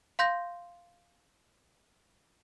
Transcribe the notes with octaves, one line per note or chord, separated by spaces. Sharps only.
F5 C6 G6 A#6